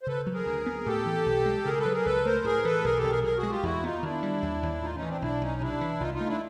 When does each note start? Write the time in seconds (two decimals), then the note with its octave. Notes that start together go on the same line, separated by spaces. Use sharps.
0.03 C5
0.07 C#3 A4 B4
0.27 F#3
0.33 G#4 A#4
0.46 D2
0.66 B3
0.86 A2 G4 A4
1.06 E3
1.26 B1
1.46 G#3
1.65 C#3 G#4 A#4
1.79 A4 B4
1.85 F#3
1.92 G#4 A#4
2.05 C#2 A4 B4
2.25 A3 A#4 C5
2.44 A2 G#4 A#4
2.64 E3 A4 B4
2.84 B1 G#4 A#4
2.97 G4 A4
3.04 B1
3.11 G#4 A#4
3.23 B2 G#4 A#4
3.37 F#4 G#4
3.43 G#3
3.50 F4 G4
3.63 E2 E4 F#4
3.83 B3 D#4 F4
4.03 D#3 D4 E4
4.23 G3
4.42 D#2
4.63 D#2
4.82 A2 D#4 F4
4.95 C#4 D#4
5.02 E3
5.08 C4 D4
5.21 B1 D4 E4
5.41 B1 C#4 D#4
5.61 C3 D4 E4
5.81 E3
6.00 C2 D#4 F4
6.14 D#4 F4
6.20 A3
6.28 D4 E4